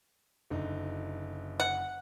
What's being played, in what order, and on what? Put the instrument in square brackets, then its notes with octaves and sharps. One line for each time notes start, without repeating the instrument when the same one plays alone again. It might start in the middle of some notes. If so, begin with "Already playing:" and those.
[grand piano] F#1 D3 D#4
[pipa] F#5